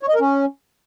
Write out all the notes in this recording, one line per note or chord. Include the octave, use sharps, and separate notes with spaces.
C#5
D#5
A#4
C#4